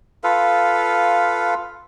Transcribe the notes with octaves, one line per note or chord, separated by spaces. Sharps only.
F4 A4 B4 F5